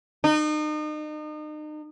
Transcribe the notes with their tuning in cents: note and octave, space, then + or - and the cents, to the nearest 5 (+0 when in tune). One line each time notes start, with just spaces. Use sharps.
D#4 -35